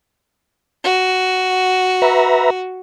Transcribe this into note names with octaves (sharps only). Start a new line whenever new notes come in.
F#4
B4 E5 A#5